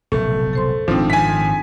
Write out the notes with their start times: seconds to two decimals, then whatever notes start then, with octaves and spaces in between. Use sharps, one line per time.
0.12 F1 B1 A#2 A3
0.53 A4 C5 C6
0.88 G#1 F3 C4 D4 D#4 G5
1.10 G#5 B6